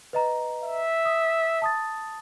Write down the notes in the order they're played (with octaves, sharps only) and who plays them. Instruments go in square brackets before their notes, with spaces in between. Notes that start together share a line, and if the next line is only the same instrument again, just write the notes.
[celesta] B4 D#5 A#5
[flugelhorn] E5
[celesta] D#6
A5 D#6 A6